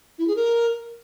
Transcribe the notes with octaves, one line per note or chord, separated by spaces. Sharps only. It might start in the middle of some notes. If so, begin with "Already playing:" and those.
E4
G#4
A#4